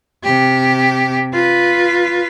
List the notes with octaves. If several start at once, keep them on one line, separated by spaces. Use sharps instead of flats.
C3 G4
F4 B4